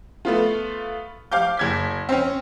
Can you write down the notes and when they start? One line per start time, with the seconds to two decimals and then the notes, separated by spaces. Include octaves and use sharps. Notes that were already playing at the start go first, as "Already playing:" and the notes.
0.25 A3 B3 F4
1.32 F5 D6 G6
1.57 F#1 G#6 B6
2.09 C4 C#4